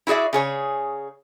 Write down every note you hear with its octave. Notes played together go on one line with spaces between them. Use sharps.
E4 F#4 G#4 D5 E5
C#3 G#4 C#5